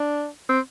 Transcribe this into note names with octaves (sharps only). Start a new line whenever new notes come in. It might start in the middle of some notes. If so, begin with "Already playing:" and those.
Already playing: D4
C4